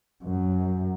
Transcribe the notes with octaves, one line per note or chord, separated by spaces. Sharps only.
F#2